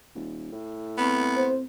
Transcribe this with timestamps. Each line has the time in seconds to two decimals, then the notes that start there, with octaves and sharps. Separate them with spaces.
0.15 D#1
0.52 A2
0.98 B3 C4
1.37 C5